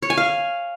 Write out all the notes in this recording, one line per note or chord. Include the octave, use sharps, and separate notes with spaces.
C#5
G#5
F5